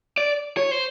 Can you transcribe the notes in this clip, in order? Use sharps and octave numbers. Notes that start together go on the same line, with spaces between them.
D5
C#5
C5